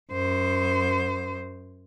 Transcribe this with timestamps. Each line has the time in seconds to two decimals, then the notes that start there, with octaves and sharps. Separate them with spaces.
0.13 F#2 C5